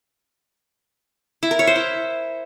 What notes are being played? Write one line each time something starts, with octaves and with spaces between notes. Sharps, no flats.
E4
A#4
C#5
C5
E4